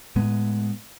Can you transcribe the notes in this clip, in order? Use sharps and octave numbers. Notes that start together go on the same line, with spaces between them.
A2 G#3 B3